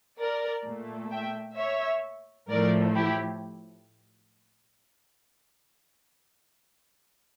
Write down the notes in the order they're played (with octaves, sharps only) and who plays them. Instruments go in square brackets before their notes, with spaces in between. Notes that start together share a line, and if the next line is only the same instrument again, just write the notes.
[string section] A#4 D5
A#2 A3
E5 G5
C#5 E5
A2 F3 A3 A#4 D5
E4 G4